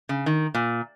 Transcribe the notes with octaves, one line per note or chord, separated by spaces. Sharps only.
C#3
D#3
A#2